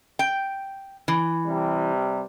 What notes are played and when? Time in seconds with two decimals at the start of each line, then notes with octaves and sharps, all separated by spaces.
0.19 G5
1.08 E3
1.46 C3 G3